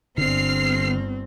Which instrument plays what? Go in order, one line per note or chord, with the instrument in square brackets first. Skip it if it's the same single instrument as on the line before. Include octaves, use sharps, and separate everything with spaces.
[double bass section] G1 [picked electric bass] D3 [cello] C4 [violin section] F6 C7